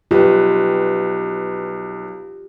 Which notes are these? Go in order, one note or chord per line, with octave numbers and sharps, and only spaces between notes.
B1 F4 G4 B4